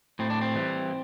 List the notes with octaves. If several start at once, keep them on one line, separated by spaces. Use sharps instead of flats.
A2 C4
D4
C4
E3 G3